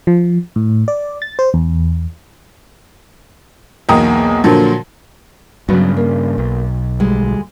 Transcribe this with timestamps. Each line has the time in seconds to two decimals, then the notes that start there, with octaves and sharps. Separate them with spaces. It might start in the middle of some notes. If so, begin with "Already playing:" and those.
0.07 F3
0.56 A2
0.88 D5
1.22 A6
1.39 C5
1.54 E2
3.89 B1 E2 A#3 G5 A#5 D#6
4.44 A#2 D3 F3 F#3
5.69 G2 C#3 F#3 B3 F#4
5.97 A#3
6.38 B1
7.00 D2 G3 G#3